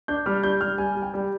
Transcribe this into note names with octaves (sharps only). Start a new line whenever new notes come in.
D4 G6
G3 F6
G3 G6
G3 F6
G3 G#5
G3
G5
G3